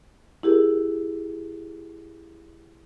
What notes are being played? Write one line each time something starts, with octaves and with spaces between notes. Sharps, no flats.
E4 G4 G#4 A#4